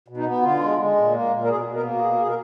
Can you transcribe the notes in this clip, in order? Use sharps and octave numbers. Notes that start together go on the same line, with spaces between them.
B2
D#4
B3
D3 F4
G#3
G#3
A#2
A#3
A#2
A#4
B2 G#4
B2
A#4
A#3
F#4
B2 G#4
B2 G#4
A#4